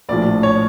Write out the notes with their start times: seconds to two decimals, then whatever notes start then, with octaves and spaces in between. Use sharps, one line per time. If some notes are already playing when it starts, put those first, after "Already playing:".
0.09 A#1 A2 F3 D5
0.43 C#5